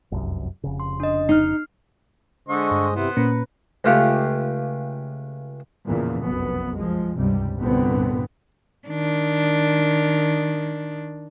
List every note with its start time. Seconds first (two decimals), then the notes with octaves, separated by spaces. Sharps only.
0.12 F1 C2 F#2
0.64 F1 C#3
0.80 C6
1.00 D4 D#5
1.29 D#4 F6 C7
2.49 D3 G#3 C5 D#5 C#6
2.71 G2
2.94 C3 B3 E4 C5
3.17 A#2 A#3 C#4 B4
3.84 C#2 A3 F4 G4 F#5 A#5
5.86 E2 A#2 C#3 E3 F3
6.22 F1 B1 F#2 B3
6.75 F3 G#3
7.16 C#2 G2 C3 G3
7.57 C2 G2 A#2 D3 B3 C4
8.89 D#3 D4